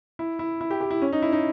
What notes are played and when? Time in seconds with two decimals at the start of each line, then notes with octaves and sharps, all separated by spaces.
0.19 E4
0.39 E4
0.61 E4
0.71 G4
0.81 G4
0.91 E4
1.02 C#4
1.12 D#4
1.22 E4
1.33 D#4